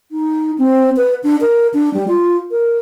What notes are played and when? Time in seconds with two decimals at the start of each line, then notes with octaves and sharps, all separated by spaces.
0.12 D#4
0.58 C4
0.97 B4
1.24 D4
1.41 A#4
1.74 D4
1.94 G3
2.08 F4
2.52 A#4